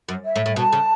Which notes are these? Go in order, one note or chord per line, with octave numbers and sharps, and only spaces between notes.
F#2
E5
A2
A2
B2 A5
C#3